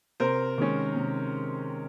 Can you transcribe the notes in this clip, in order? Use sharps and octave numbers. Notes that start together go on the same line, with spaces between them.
C3 A#4 C5
D#3 G#3 C#4
C3